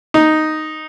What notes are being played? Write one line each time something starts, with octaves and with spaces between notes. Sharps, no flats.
D#4